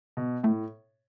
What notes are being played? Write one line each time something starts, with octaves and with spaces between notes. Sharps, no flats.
B2
A2 A3